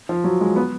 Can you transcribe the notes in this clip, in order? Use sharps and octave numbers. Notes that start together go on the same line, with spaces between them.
F3
F#3
G#3
B3